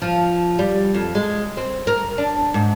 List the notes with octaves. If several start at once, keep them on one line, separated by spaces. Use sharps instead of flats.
F3
G3
F2
G#3
C4
A#4
D4
G#2